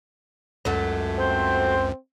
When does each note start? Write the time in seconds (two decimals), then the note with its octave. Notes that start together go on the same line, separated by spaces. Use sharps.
0.65 C#2 F#2 F#3 A3
1.19 C4 C5